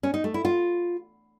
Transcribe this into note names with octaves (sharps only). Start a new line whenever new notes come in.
C#4
D#4
A3
E4
F4